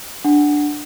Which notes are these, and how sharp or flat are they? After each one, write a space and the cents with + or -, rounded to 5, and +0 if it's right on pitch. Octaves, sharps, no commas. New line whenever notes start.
D4 +0 F#5 +5